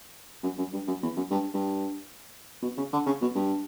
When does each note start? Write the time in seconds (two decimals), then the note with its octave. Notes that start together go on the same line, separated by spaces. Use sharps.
0.43 F#2
0.58 F#2
0.73 G2
0.87 F#2
1.03 E2
1.16 F#2
1.31 G2
1.54 G2
2.62 B2
2.78 C#3
2.93 D3
3.06 C#3
3.22 B2
3.35 G2